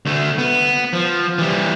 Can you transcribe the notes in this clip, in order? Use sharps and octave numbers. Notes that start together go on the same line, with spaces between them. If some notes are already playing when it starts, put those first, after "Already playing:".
D2 A3
B3
F3
E3 G3